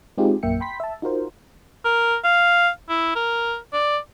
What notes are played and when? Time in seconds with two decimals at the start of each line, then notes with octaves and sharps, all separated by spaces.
0.18 G#3 C4 D#4 F4 G4 G#4
0.43 A#1 F#2 A#3 E5 G5 C#7
0.60 G5 B5 C6 B6
0.80 E5 A5
1.02 D#4 F4 F#4 A#4 C5
1.85 A#4
2.24 F5
2.89 E4
3.15 A#4
3.73 D5